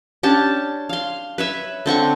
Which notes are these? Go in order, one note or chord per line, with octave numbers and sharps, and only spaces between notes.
C#4 D4 G4 A5
F5 C6
B4 C#5 E5
D3 C4 F#5 C#6